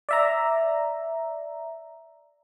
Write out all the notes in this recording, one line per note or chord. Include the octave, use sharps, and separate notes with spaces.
D5 E5 A#5